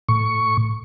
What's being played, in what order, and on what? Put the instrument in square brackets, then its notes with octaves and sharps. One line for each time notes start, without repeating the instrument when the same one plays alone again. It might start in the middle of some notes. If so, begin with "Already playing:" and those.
[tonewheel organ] A2 C#6